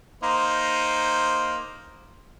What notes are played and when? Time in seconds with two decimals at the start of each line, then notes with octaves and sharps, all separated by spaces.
0.23 A#3 D#4 C5